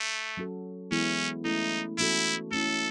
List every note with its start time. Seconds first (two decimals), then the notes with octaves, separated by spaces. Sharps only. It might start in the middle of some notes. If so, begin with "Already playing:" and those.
Already playing: A3
0.37 F#3 C#4 F#4 A4
0.91 E3 G#3 B3 C#4 E4 G#4
1.45 A3 C#4 D#4 E4 A4
1.98 E3 A3 C#4 E4 F#4 A4
2.52 A3 C#4 E4 A4